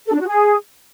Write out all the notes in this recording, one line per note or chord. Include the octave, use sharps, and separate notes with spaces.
A4
D4
F#4
G#4